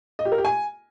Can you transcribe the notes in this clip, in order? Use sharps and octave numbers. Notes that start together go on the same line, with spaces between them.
D#5
G4
A#4
G4
G#5